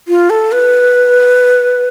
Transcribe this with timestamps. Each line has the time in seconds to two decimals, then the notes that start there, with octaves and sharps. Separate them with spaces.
0.08 F4
0.30 A4
0.52 B4